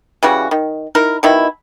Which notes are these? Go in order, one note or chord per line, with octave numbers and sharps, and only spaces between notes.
C#3 E3 G3 F#4
D#3
D#4 E4 A#4
B2 D#3 E4